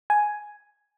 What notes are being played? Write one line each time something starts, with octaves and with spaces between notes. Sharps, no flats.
G#5